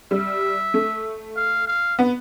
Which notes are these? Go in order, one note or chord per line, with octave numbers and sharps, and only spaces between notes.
G3 E5
A3
F5
F5
B3